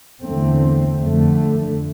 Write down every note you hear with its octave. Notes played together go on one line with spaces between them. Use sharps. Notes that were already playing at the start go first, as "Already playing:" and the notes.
E2 D3 A3 C4
F2 D3 A3